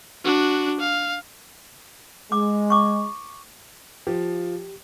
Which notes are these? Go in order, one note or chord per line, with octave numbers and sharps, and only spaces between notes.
D4 F#4
F5
G#3 D6
C#6 D6
F3 G4